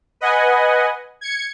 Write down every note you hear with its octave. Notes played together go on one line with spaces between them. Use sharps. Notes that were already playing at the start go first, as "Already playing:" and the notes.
B4 D#5 F#5 G#5
G#6 C#7